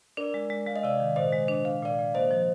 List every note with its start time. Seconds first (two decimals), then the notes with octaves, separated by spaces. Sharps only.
0.17 D4 A#4 D5
0.34 G#3
0.50 G#3
0.67 G#3 F5
0.76 D#5
0.83 C3 D5 F5
1.00 D#3
1.16 A#2 C5 D#5
1.33 G#3
1.48 D4
1.65 D4 F5
1.82 A#2 D5 F5
1.99 A#2
2.14 A#3 C5 D#5
2.31 F3